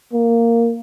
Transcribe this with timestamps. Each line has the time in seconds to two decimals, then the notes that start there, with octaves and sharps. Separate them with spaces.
0.13 A#3